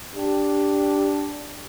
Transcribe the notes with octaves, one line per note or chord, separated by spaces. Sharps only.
D4 G4